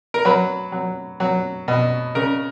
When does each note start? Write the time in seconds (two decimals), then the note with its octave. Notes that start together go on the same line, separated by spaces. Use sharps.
0.14 A#4
0.25 F#3 B4
0.72 F#3
1.20 F#3
1.68 B2
2.15 C#3 A#4